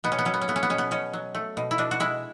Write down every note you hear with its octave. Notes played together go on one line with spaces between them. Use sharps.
B2 B3
C#4
B3
F#3 C#4
B3
C#4
A3 B3
C#4
B3
B2 C#4
B3
B2 C#4
F#3
A3
B2
E4
B2 D4
F#4
G#3 E4